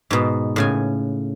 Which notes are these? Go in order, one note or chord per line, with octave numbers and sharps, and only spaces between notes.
G#2 B2
A2 C#3 G#5